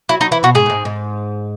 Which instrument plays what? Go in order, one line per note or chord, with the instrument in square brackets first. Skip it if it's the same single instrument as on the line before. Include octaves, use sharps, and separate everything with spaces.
[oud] F#3 [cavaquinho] E4
[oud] F#3 [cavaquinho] D#4
[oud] E3 [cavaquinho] E4
[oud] B2 [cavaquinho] F#4
[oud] G#2 [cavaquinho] G#4
[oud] A2
G#2
G#2